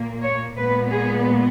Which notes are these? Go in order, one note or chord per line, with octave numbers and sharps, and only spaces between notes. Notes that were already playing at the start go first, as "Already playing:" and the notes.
Already playing: A#2 A#3
C#5
A#2 G#3 B3 B4
G#4